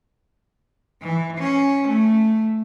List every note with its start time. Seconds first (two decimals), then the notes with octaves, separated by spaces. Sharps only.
1.02 E3
1.38 C#4
1.88 A3